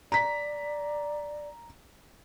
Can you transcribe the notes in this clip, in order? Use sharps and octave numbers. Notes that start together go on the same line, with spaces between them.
D5 A#5 B6